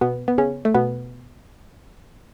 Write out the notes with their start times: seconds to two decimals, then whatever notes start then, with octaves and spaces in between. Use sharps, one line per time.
0.01 B2 B3
0.28 B3
0.38 C#3 C#4
0.65 A3
0.74 B2 B3